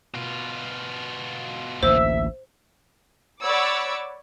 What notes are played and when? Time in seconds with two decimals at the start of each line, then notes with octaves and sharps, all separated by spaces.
0.14 B2 F4
1.83 A1 D2 A#3 C5 E5
3.41 C#5 D5 F#5 B5 D6 E6